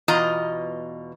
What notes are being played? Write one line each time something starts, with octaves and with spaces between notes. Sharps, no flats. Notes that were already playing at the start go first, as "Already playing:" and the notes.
E2 B2 F4 D#5 A#5